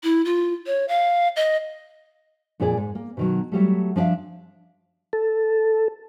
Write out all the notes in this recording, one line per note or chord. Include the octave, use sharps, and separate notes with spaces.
E4
F4
C#5
F5
D#5
F2 A#2 F4 G#4 D5
G#2
A#3
B2 D#3 F#3
F#3 G3 A3
F3 D4 B4 E5 F5
A4